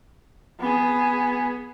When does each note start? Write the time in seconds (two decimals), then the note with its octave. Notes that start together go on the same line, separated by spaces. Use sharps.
0.60 B3 G#4